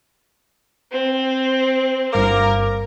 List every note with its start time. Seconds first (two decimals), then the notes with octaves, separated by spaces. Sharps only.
0.91 C4
2.13 G1 G2 A#3 A#4 D6